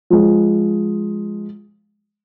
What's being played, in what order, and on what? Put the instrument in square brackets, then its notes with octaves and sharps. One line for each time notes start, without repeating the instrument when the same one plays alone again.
[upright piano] F3 G#3